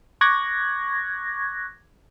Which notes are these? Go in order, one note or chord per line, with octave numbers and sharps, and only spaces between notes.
C#6 D6 F#6 G#6 A#6